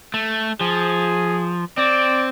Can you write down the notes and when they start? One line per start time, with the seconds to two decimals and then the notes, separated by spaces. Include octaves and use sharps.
0.14 A3
0.61 F3 G#4
1.78 C4 D5